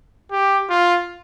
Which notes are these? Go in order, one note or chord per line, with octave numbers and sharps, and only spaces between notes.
G4
F4